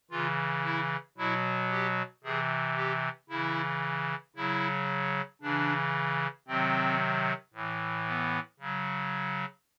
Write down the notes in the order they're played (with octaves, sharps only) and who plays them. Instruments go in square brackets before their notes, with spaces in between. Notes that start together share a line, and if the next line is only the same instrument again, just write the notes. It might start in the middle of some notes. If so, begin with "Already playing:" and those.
[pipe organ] C#3 E3 F4
E4
B2 F#3 E4
G4
C3 E3 G#4
G4
C#3 E3 E4
C#3 F#3 E4
C#3 E3 D4
C3 D#3 F#3 C4
A2 E3
B3
C#3 F#3